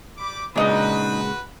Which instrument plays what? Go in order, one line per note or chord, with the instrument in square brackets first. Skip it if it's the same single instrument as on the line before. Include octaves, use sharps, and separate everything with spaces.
[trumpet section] G3 B5 D6
[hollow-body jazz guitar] A#2 C#3 G#3 [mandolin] D4 D#4 D#5 [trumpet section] F#4 B4